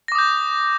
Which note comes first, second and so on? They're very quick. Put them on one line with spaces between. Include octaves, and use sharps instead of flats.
A#6 D6 D#6 G6